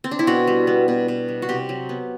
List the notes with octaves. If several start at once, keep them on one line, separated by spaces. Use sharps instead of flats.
C4
D4
E4
B2 F#4
G3
B3
B2
B2
G3
F#4
C3 G4
F#3
B3